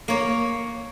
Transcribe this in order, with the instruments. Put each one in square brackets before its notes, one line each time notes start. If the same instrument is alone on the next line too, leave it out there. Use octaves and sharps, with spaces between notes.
[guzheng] A#3 C#5